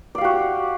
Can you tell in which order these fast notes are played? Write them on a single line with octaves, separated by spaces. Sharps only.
D5 F5 G4 F#4